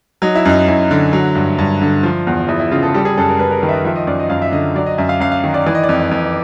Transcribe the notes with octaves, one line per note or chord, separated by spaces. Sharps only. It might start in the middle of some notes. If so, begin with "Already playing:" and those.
F#3 D#4
E4
F#2 D#4
F#2 E4
D3
F#3
G2
G2
D3
F3
E2
E2 E4
E4
C#3 F4
A4
G3 A4
G#4
F#2 A4
A#4
F#2 B4
A#4
D#3 B4
E5
D#5
F3 E5
D#5
F#2 D5
D#5
F#2 F5
E5
D3 D#5
F#3 D5
D#5
F#2 E5
F5
F#2 F5
F5
D#3
D5
E3 D5
D#5
D5
F2
F2